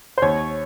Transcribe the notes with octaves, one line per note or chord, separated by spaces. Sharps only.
C5
D#2 C#5